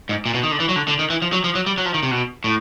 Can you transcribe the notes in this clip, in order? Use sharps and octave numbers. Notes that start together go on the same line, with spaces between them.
G#2
A#2
B2
D#3
D3
E3
F#3
D3
D3
D#3
E3
F3
F#3
F3
F#3
G3
F#3
F3
D#3
C3
B2
A2